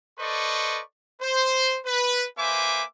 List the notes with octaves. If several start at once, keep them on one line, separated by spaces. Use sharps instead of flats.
A4 B4 C5 D5 D#5 C#6
C5
B4
A#3 B4 C5 E5 G#5 D6